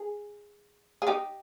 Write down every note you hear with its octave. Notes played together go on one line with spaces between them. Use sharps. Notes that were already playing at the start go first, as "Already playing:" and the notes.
Already playing: G#4
G#4
D#4 G4